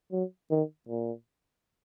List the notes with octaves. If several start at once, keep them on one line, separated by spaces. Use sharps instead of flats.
F#3
D#3
A#2